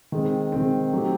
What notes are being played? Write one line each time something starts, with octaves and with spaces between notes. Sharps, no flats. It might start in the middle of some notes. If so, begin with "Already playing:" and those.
D#3 G#3 C4
D#3 G#3 C4
F#3 A3 C4 D#4 G4